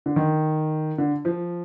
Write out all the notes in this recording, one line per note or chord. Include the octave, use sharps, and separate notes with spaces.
D3
D#3
D3
F3